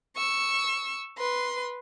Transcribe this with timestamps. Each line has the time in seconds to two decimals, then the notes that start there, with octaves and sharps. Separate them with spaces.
0.16 C#6 E6
1.18 B4 C6